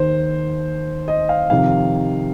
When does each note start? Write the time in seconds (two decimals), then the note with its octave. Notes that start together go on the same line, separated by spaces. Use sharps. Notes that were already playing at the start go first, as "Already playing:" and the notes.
Already playing: D#2 D#3 C5
1.08 D#5
1.29 F5
1.50 F2 C3 D#3 F5